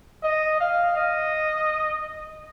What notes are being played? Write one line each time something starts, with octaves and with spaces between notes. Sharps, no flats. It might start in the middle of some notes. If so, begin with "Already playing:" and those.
D#5
F5
D#5